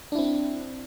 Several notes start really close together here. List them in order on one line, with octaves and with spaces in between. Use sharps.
D4 E4 C4